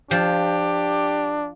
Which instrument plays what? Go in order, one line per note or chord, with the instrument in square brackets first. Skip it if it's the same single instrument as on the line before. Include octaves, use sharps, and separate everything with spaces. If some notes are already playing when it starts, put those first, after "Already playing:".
[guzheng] F3 [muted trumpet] D4 [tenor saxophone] G4